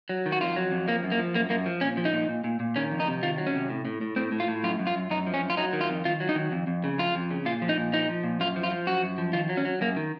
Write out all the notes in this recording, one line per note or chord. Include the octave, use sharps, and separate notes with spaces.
F#3
D#3
F#4
F2 F4
F#3
F2
F3 A#3
F#2
A#3
F3
F#2 A#3
F#2 A#3
F3
A#2 C#4
F3
D#4
A#2
A#2
A#2
A#2
D#3 C#4
F2
D#4
C3
D#3 F4
F#3
C#4
C3
A2
A2
A2
A2 C4
A2
F4
A2
F#2 F4
F#2
F4
F#2
F#2 D#4
F3
C#4
F#2
F4
F#3 D#4
D#3
F4
F2
D#3 F4
F#3
D#4
D#3
F2
F2
C#3
F2 F4
F2
C#3
A#2 F4
F3
D#4
A#2
F3 D#4
F3
A#2
F#2 F4
F3
F4
F3
F#2 F#4
F#2
F3
D#3 F4
F#3
C#4
F#3
F#2 A#3
D#3